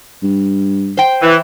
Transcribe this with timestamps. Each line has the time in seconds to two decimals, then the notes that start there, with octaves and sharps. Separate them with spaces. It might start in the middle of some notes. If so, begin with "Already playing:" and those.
0.23 G2
0.97 C5 G5
1.22 E3